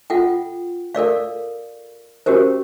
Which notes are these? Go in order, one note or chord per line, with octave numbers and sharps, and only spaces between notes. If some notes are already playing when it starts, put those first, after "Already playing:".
F4 A4 F#5 G5
A4 A#4 D5 F5
C#4 F#4 G4 A#4 C5